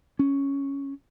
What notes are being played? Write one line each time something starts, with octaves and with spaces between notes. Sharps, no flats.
C#4